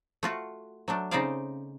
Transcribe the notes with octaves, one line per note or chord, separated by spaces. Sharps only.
A3 F4 F#4
F#3 A3 D4
C#3 C4 D#4 C5 D5 F5